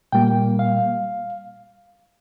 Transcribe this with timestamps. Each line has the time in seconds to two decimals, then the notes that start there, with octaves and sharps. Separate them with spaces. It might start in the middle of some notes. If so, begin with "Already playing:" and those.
0.12 A#2 G3 A#3 G5
0.59 F5